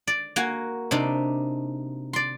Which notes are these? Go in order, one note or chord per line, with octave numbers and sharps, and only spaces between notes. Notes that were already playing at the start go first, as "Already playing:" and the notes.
D5
A#3 F#4 G#5
C3 D4 D#4
D5 C6